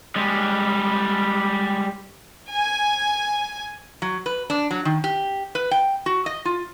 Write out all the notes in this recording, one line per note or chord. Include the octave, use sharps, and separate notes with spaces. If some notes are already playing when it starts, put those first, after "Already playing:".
G3 G#3
G#5
F#3
B4
D4
F#3
D#3
G4
B4
G5
F#4
D#5
F4